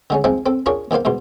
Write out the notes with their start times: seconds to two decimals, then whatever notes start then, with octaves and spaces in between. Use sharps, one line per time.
0.10 D3 G#3 C#4
0.24 F3 G#3 C4 D#4 F5
0.46 C4 A4
0.66 D4 F4 G#4 A#4 C#5
0.91 E2 D#3 A#3 C5 F5
1.05 E2 G#2 B2 C6